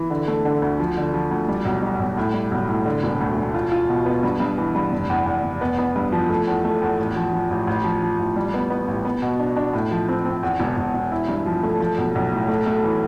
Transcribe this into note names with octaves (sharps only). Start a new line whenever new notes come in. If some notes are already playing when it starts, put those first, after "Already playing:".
Already playing: E3
D3
A3
D3
D2
F3
D3
F3
D2
G3
B1
G3
B1
A2
G3
B1
A2
D3
E1
D2
E1
F4
F4
B2
B3
G2
G2
E3
G2
F1
E2
E2
F1
B3
B3
G2
F3
A3
E2
A3
E2
A1
F3
F3
A1
A1
F3
F3
A1
G3
B3
B3
A1
B3
B2
D4
D4
A2
F3
C4
C4
E2
E1
E1
E1
E4
G2
F3
A3
F3
B1
B1
A2
A3
A3
E3